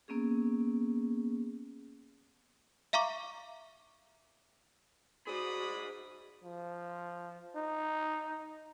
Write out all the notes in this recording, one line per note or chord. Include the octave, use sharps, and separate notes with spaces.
A#3 B3 C#4 G#4
E5 F5 A#5 C#6 D6
F#4 G#4 C5 D5 B5 D#6
F3
D#4